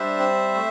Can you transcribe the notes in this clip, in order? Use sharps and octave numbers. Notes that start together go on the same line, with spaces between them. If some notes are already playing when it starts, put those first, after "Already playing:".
Already playing: G3 D4 C5 E5
C4
A3